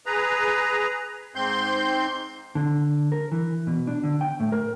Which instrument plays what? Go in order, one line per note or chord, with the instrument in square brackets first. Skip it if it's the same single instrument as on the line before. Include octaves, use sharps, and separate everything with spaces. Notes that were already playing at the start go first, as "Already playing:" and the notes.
[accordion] G#4 B4 A#5
G#2 C4 C6 G6
[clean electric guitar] D3
A#4
E3
B2
D4
D3
G5
A2
A#4